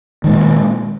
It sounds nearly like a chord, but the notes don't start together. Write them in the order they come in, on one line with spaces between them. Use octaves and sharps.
D#3 G#3 A#2